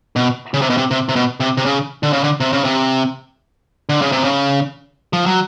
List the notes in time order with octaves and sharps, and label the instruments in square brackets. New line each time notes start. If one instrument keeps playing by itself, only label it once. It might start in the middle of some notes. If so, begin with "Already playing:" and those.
[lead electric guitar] B2
C#3
C3
B2
C3
C3
C3
B2
C3
C3
C#3
D3
C#3
D3
C3
C#3
C3
D3
C#3
C3
C#3
F3
F#3